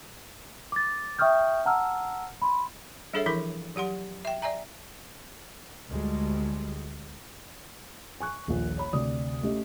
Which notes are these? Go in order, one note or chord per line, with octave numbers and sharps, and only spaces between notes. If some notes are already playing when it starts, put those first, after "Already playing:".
D6 A6
E5 G5 C#6 D#6 F6 G6
F#5 A5 A#5 E6 F6
B5 C6
G3 D4 G#4 A4 C#5 E5
E3 F3 E4 A#4 B5
F#3 G4 F#5 C6
E5 G5
D5 E5 G#5 A#5
D2 G3 G#3
G#5 C#6 F#6
D#1 A#1
C#5 B5
D2 C3 D5 D#6
A3 C#4 G4 D#5